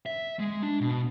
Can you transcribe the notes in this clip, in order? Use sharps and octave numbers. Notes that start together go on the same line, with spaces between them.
E5
G#3
D4
B2